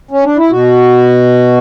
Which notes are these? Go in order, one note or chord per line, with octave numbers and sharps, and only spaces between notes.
C#4
D4
E4
B2 F#4